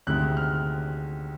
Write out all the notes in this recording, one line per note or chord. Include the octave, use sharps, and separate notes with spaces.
D2 C3 D#3 G#3 F#6
F6